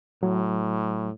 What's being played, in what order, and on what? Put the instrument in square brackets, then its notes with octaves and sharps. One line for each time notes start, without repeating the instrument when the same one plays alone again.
[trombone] A2 [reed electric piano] F#3